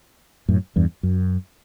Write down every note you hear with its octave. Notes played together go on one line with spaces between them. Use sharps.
F#2 A2
E2 G2
F#2